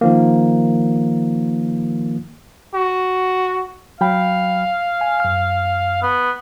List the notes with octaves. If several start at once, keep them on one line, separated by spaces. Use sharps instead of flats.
D#3 F3 A#3
F#4
F#3 F5 G5 B5
G#5
F#2 F6
B3